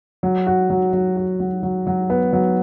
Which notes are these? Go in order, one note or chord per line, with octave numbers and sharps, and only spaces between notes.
F#3
F#4
F#3
F#3
F#4
F#3
F#3
F#3
B3
F#3